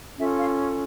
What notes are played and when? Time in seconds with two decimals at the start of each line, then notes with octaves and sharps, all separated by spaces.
0.18 C#4 F4 A4 E5
0.38 F5